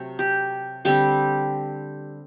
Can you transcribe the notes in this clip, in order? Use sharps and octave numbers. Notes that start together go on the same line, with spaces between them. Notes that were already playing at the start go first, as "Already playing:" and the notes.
Already playing: C3 F#3 A3
G4
D3 G3 C4 G4